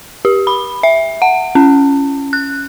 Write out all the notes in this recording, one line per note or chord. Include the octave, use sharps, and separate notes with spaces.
G4
B5
E5
F#5
C#4
F#6